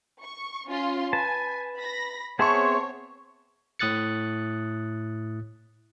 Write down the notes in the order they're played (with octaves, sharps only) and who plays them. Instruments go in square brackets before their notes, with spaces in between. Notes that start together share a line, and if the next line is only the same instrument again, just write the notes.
[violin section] C#6
C#4 F4 C6
[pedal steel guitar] B4 A5 [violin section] G#5
[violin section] B5 A#6
[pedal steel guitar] B3 G#4 E5 [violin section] C4 C#5 [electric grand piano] A5 C6 C#6
[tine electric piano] A2 D#6 F#6 A6 C#7